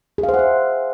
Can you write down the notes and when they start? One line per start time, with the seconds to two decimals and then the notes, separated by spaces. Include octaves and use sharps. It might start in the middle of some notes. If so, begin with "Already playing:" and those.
0.18 G#4
0.23 F5
0.29 C5
0.34 F#5
0.39 E5